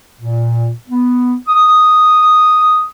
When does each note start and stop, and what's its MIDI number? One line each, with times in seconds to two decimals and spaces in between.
0.21 0.70 46
0.89 1.34 59
1.48 2.85 87